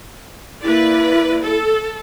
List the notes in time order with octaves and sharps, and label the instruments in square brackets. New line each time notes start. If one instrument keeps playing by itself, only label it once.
[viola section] A#3 B4 D5 [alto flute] E4
[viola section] A4